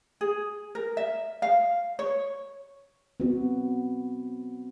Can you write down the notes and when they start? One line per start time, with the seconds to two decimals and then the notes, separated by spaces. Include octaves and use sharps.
0.21 G#4
0.75 A#4
0.97 E5
1.42 F5
1.99 C#5
3.20 B3 C4 F#4